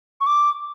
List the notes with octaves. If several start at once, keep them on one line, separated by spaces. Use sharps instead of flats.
C#6
D6